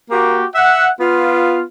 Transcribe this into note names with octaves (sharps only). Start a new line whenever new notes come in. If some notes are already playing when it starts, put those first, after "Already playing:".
A#3 F#4 G4
E5 F#5
B3 F4